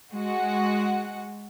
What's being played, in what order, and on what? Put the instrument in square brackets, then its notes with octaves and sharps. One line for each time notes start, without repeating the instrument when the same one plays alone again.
[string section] G#3 F#4 F#5